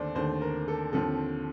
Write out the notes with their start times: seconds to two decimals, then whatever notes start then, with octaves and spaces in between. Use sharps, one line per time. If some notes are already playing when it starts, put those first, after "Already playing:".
Already playing: D#2 D3 A3 C5 D5
0.15 D#2 D3 A3 C5
0.41 A#4
0.68 A4
0.93 D#2 D3 F3 C4 A4